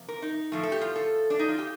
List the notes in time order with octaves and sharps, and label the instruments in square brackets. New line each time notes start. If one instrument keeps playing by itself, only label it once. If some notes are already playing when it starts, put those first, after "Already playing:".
Already playing: [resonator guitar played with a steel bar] C3 F3 A#3
A#4
D#4
A2 F3 A3
A4
G4
F4
A4
D4
D#4
F4
G4